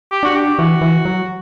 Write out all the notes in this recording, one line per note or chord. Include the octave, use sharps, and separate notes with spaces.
G4
D4 F#4
G4
E3 F#4
E3
F#3